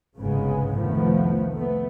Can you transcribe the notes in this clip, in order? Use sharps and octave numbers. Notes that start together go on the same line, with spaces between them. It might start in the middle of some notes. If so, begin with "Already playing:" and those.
G1 C2 G#2 C#3 G#3 B3
F1 C2 D#3 F3 A3 B3
A3 B3